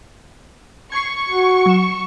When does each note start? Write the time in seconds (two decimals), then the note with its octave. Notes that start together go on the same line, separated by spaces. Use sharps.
0.92 C#6 G#6 C7
1.29 F#4
1.66 F#3 E7